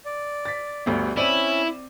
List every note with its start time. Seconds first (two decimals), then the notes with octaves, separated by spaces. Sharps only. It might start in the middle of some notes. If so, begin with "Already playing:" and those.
0.05 D5
0.45 A6 B6
0.86 G1 D2 G2
1.17 C4 C#4 E4 D5 B5 D#7